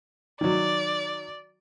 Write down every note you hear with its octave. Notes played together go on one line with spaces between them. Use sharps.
D#3 F#3 D5